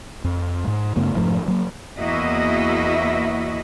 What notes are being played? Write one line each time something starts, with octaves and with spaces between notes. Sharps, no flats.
F2
G#2
F#2 C#3 A3 B3
F1 G#2 F3 A3
F#3 A#3
E2 A#3 E4 F#4 D#5 E5